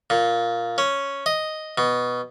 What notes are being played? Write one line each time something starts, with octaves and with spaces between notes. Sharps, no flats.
A#2
C#4
D#5
B2